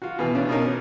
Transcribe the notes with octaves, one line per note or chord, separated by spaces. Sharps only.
F4 F#4
B2 E3
C#3 C#4 D4 F4
B2 C#4 D#4 A#4
C#4